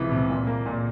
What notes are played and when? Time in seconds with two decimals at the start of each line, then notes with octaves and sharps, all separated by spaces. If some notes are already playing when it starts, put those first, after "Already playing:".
Already playing: C#2 C3 E3 F3
0.11 C3
0.30 A#2
0.47 A#3
0.66 A#2